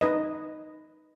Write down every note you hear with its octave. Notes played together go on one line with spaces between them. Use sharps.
D#4 B4 D#5